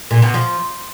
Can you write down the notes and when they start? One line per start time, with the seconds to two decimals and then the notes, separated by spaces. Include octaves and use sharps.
0.11 A#2
0.22 B2
0.34 F3